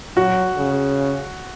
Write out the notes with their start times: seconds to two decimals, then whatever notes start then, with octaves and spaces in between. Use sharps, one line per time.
0.16 F#3 F#4
0.57 C#3